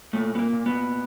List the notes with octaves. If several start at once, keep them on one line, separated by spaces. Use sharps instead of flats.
A#2 A3
B3
A#3
A#2
B3